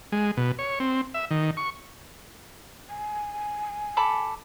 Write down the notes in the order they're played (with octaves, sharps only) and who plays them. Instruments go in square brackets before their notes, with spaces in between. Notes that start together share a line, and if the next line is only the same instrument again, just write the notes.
[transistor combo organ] G#3
B2
C#5
C4
E5
D#3
C#6
[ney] G#5
[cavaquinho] A4 B5 D6